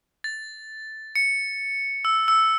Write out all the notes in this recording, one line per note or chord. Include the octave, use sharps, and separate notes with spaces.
A6
C#7
E6
E6